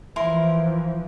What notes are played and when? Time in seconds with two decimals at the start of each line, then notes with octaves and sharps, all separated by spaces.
0.16 E3 F3 E4 A#4 C6